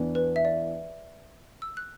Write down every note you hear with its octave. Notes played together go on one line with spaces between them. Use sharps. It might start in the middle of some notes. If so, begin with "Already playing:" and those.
Already playing: E2 E3 D4
B4
E5
D5
E6
F#6